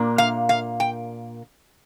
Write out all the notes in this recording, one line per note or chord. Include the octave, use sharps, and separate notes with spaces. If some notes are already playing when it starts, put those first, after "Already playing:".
Already playing: A#2 A#3 D4
F5
F5
G5